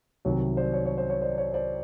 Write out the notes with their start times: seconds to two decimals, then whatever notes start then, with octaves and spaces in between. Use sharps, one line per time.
0.25 C2 C3 D#3 F#3 C#5
0.57 C5 D5
0.74 C#5
0.86 C#5
0.98 C5
1.10 C#5
1.22 C5 D5
1.38 C#5
1.54 C5 D5